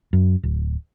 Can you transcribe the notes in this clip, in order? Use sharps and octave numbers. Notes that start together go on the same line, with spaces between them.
F#2
D1